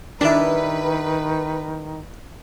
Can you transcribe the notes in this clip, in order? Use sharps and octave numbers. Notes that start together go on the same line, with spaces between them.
D#3 G3 D4 E4 B4